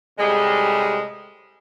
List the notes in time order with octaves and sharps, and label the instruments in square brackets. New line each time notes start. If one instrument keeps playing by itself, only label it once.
[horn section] A2 C3 G3 G#3